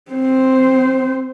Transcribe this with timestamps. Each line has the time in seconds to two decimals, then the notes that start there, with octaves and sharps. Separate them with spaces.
0.12 C4 C5